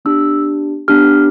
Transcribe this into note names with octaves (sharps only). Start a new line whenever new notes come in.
B3 D4 G4 E6
B3 D4 G4 F6